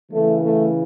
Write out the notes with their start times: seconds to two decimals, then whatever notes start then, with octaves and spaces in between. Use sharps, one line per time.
0.11 C#3 E3 A3
0.42 A3